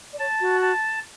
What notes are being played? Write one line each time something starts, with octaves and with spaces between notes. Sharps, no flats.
D5
C#5 A5
F#4
A5